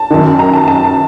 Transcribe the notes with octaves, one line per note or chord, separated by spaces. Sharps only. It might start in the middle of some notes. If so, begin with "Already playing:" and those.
Already playing: A5
F#2 D#3
A#5
A5
A5